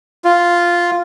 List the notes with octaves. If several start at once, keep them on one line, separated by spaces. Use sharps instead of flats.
F4